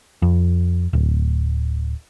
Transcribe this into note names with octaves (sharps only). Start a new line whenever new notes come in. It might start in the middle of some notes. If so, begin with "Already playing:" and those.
F2
D1